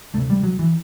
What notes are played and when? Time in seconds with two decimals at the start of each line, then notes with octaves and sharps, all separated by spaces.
0.14 D2 C3 A3
0.30 G3
0.43 F#3
0.59 E3